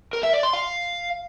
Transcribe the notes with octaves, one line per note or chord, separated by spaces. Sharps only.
A#4
E5
D5
C6
F5